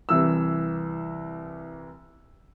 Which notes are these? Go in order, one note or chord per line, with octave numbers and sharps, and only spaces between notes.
C2 E3 E6